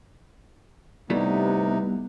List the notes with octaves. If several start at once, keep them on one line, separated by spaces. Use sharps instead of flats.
C3 G3 A3 B3 D#4 E4